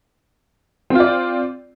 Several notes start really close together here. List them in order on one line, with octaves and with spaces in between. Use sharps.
C4 F4 D5